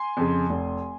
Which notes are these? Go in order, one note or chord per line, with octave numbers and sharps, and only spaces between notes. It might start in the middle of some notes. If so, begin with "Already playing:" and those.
Already playing: G#5 C6
F2 C#3
F1